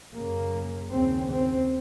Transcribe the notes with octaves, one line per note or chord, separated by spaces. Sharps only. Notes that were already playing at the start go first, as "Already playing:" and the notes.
F#2 C#3 A#3
D#2 C#3 C4
C4